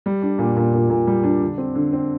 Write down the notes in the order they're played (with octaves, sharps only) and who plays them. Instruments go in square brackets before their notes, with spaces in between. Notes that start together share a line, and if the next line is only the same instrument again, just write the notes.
[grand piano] G3
D4
A#2
A#2
A#2
A#2
G3
D4
D3
C4
D3
C4